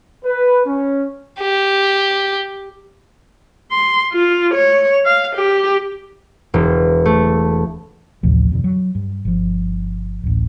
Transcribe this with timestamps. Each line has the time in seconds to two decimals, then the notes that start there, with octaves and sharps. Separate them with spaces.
0.25 B4
0.66 C#4
1.41 G4
3.72 C6
4.13 F4
4.54 C#5
5.06 F5
5.36 G4
6.54 E1
7.05 A3
8.23 A1 D2 C3 F3
8.52 F2 B2 D3
8.64 F#3
8.95 G2
9.25 G1 F3
10.23 D1 A1